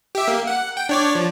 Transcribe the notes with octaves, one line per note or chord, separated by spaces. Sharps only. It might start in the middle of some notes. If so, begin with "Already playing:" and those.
G4 E5
A#3
F#5
G5
D4 C#5 D5
F3